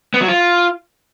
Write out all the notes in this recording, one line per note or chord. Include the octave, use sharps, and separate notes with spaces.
B3
F#3
F4